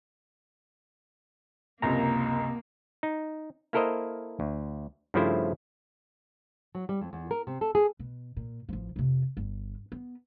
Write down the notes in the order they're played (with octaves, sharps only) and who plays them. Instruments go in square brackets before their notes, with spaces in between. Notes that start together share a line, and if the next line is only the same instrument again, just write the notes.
[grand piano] F#1 C#2 [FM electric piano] C3 A#5 [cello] A#3
[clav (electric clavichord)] D#4
A#3 E4 A4 A#4 C5 D#5
D2
G2 C#3 F3 A3 E4 C5
[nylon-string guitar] F#3
G3
F2
E2
A#4
C3
A4
G#4
[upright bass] B2
A#2
A1 F3
F2 C3
G1
B3